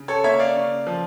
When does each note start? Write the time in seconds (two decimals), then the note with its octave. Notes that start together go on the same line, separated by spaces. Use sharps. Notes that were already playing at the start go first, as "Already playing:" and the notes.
Already playing: C#3
0.08 A4 C#5
0.24 A#3 C#5 E5
0.40 D5 F5
0.56 C#3
0.87 F3